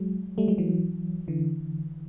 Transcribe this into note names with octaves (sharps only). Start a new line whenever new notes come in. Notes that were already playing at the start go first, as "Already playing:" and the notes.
Already playing: F#3 G#3
G3 A3
F#3 G#3
E3 F#3
D3 E3